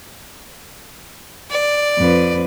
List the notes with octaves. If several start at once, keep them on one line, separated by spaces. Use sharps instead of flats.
D5
F2 B4